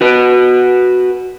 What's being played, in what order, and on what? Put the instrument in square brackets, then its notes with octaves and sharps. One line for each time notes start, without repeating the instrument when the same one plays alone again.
[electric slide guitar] F#4 B4